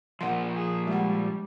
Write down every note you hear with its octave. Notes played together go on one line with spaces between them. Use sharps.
A#2 F3 F#5 C6
G#4
G3 G#3 F#5